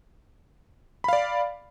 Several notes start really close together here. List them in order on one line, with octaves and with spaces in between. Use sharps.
B5 F5 D5